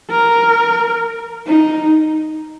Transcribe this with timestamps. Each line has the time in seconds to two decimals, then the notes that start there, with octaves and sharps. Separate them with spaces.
0.11 A#4
1.47 D#4